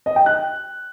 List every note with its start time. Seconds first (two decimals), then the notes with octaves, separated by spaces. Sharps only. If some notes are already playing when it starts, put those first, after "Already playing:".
0.06 D#5
0.16 G5
0.26 F#6